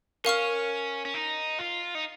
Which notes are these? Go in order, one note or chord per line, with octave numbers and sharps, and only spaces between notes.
C#4 A#4 F5 C#6 F6
C#4
D#4
F4
D#4